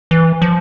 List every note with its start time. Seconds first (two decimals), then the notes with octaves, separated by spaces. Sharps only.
0.11 E3
0.42 F3